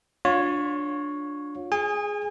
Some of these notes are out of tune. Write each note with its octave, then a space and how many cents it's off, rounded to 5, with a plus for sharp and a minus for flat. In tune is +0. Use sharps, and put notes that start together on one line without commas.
D4 +0 F4 +35 C#5 +0
G#4 +0 G#5 -35